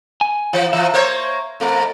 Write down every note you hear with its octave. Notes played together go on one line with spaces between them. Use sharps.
G#5
E3
E3 F3 E5
A#3 C5 C#5
F2 A3